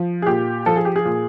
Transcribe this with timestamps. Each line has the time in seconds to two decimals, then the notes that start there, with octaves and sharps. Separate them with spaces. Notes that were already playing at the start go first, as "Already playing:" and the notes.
Already playing: F3
0.22 G#4
0.26 A#2 G4
0.66 F3 A4
0.76 G#4
0.85 G4
0.96 G#4
1.05 A#2